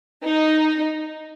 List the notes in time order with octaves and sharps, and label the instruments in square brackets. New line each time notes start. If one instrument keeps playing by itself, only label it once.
[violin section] D#4